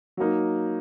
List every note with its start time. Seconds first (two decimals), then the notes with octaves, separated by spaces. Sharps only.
0.17 F#3 A#3 D#4